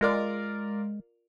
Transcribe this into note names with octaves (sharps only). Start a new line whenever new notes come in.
G#3 F4 A#4 D5